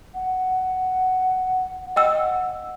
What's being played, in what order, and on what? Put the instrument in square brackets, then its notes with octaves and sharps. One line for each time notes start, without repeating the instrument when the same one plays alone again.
[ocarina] F#5
[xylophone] D#5 G5 E6 [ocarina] F#5